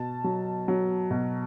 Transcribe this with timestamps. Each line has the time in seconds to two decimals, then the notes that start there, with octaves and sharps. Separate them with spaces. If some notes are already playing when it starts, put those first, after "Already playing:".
Already playing: B2 A5
0.24 F#3
0.68 F#3
1.11 B2